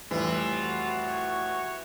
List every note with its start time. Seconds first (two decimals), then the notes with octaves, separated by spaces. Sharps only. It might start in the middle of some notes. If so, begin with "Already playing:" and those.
0.11 F2 A2 E3 G3 F4
0.59 F#4
1.07 C#5